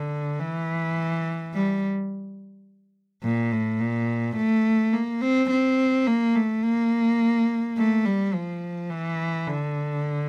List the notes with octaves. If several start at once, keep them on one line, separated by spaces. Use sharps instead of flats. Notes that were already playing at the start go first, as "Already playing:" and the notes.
Already playing: D3
E3
G3
A#2
A2
A#2
A3
A#3
C4
C4
A#3
A3
A#3
A3
G3
F3
E3
D3